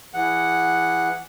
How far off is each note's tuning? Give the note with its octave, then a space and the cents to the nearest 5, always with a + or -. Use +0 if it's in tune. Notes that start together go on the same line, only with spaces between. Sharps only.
E3 +10 G#4 -20 F#5 +0